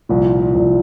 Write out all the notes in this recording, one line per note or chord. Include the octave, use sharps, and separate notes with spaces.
C2 A#2 F3
C2 A#2 F3